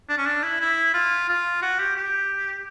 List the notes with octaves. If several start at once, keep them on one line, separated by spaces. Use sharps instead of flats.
D4
C#4
D4
E4
E4
F4
F4
F#4
G4
G4